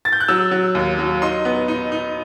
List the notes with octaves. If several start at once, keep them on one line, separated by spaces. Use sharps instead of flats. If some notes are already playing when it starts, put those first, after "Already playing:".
A6
G6
F#6
F#3 E6
F#3
D#2
F#3
D#4 C6
B3
D#4
D#4